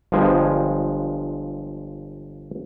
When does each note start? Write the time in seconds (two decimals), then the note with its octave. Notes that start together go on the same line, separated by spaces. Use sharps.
0.12 G1 G2 F3 G#3 C5 G#5